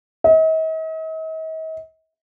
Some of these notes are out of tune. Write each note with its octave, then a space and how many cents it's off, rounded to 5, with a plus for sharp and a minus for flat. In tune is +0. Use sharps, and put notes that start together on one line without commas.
D#5 +45